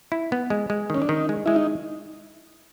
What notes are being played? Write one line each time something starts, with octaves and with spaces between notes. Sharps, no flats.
E4
B3
G#3
G#3
D#3 C#4
D4
D#3 D#4
G#3
G#3 E4
D#4